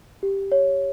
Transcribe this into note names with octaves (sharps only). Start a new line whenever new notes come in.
G4
C#5